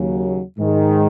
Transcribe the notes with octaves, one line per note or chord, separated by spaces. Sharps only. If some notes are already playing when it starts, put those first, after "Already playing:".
Already playing: D#2 C#3 F#3
G#2 D#3 G#3